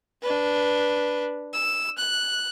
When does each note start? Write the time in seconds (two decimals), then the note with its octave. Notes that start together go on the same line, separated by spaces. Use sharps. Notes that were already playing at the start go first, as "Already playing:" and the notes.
0.22 D4 B4
1.54 E6
1.98 F#6